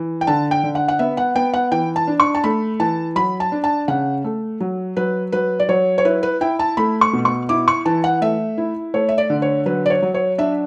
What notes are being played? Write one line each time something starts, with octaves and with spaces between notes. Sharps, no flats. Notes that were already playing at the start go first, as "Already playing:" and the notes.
Already playing: E3
G5
D3 A5
G5
D3
F#5
F#5
B3 E5
F#5
B3 G5
F#5
E3 G5
A5
D4
C#6
A5
A3 B5
E3 A5
F#3 B5
A5
D4
A5
C#3 F#5
A3
F#3
F#3 B4
F#3 B4
D5
F#3 C#5
C#5
E4 B4
B4
E4 G5
A5
A3 B5
C#6
B2
C#6
E4 D6
C#6
E3 A5
F#5
A3 E5
E4
A3 C#5
E5
D5
D3
C#5
F#3 B4
D5
C#5
F#3
C#5
D4 E5